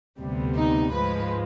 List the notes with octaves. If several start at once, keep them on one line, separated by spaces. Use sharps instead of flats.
D2 C3 G3 B3
D#4
G#2 F3 G#3 B4